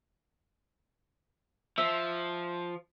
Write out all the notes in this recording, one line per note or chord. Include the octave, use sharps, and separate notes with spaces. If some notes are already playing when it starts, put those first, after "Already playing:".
F3 E5